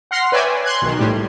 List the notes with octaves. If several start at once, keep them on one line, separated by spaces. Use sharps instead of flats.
F#5 C6 F6 A#6 C7
B4 C#5 D5 E5 G5 G#5
C6 F#6 G#6
B1 D#3
A2 G3